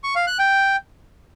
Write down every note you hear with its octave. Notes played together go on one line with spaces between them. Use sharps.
C#6
F5
F#6
G5